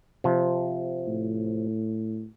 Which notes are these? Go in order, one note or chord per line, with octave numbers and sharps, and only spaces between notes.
C3 F3
A2